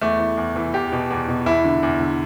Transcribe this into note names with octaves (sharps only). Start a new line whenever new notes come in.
E2 A3
E3
E2
E3
E2 G4
B2
E2
B2
E2 E4
D3
E2
D3